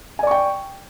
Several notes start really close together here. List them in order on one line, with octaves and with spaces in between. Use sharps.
G#5 D5 C#6 G5